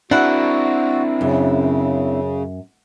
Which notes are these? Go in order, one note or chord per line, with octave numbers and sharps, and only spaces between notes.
C4 D4 E4 F#4 A#4 F#5
F#2 C#3